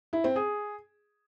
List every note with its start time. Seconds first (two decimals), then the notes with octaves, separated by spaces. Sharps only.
0.13 E4
0.24 C4
0.36 G#4